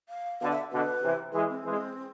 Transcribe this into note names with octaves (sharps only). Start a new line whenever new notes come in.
F5
B2 D3 F5
E5
B2 D3 B4
C3 E3
E3 G#3 G#4
C4
E3 G#3